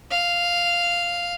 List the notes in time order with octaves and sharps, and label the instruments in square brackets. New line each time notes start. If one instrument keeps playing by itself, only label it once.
[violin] F5